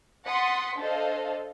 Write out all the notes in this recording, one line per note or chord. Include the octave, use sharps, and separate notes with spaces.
F#5 C6 D#6 A6 B6 C#7
D4 A4 C5 D#5 F5